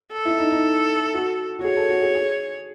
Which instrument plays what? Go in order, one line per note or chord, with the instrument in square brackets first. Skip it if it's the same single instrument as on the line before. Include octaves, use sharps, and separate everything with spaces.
[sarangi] A4
[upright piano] E4
D#4
D#4
F#4
F#4
[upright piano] G#4 [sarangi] C#5
[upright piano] A4
F#4
G#4
G#4